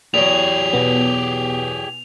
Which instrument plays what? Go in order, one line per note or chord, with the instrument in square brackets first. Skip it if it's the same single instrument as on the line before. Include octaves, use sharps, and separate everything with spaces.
[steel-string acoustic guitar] E2 F#3 [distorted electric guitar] G4 G#4 [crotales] F7
[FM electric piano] B2 B3